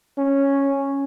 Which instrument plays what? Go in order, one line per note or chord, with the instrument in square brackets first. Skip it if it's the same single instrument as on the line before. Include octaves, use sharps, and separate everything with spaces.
[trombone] C#4